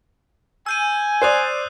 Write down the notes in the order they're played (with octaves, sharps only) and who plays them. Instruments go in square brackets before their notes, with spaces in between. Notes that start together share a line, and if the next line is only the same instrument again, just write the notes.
[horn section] G#5 [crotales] E6 G6 D#7
[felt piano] C5 D5 [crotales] D#6 F#6 C7